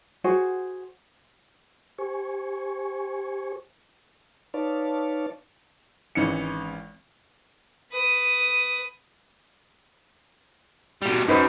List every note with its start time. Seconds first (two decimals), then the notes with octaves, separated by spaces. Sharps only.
0.24 F#4 G#4 C5 F#5
1.98 G4 C5 G#5 C#6
4.54 D#4 B4 C#5 D5 F5 A5
6.15 G#1 E3 C#4 D#4 C#7
7.92 B4 D#6
11.02 B2 G3
11.28 F#2 D#4 B4 C5